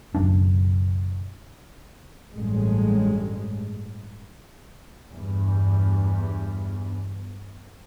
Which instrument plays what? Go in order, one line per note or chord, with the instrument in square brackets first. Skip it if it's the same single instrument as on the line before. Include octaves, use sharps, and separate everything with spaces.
[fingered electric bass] F#1 B1 F#2 D4
[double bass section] A1 G2 G#3
E2 G2